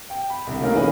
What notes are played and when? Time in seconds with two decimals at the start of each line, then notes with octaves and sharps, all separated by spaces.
0.10 G5
0.30 B5
0.47 C2 D3
0.62 A3 A#3 C#4 D#4 E4 A#4
0.73 E3 C#4 G#4 B4 D#5